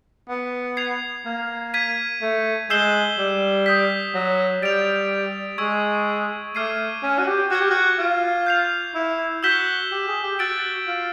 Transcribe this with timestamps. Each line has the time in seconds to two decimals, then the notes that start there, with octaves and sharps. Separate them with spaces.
0.29 B3
0.77 G#6 C7 F7
1.26 A#3
1.74 G#6 B6 D#7
2.21 A3
2.70 G#3 E6 G6 C7 E7 G7
3.18 G3
3.66 D#6 G6 B6
4.14 F#3
4.62 G3 A6 D7 F7
5.58 G#3 C#6 E6 G#6
6.55 A3 D6 F6 G#6 C7 D#7
7.03 C#4
7.19 F#4
7.27 G4
7.50 F#4 D6 F6 G#6
7.60 G4
7.70 F#4
7.99 F4
8.46 G6 C7 F7
8.95 E4
9.43 F#4 E6 G6 B6 E7 G7
9.91 G4
10.08 G#4
10.23 G4
10.39 F#4 E6 A6 D7
10.87 F4